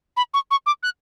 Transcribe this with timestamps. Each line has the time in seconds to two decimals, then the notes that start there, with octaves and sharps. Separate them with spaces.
0.17 B5
0.34 C#6
0.51 C#6
0.66 D6
0.83 F#6